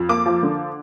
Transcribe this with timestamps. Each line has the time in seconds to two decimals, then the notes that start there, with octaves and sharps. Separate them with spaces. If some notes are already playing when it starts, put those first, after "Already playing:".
Already playing: F2
0.09 A#3 D6
0.26 F3
0.43 D3